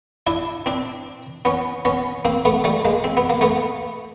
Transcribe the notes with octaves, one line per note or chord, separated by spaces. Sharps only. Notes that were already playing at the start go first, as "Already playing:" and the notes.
D4 E4
C4 D4
B3 C#4
B3 C#4
A#3 C4
A3 B3
G3 A3
G#3 A#3
C4
B3
A#3
A3 B3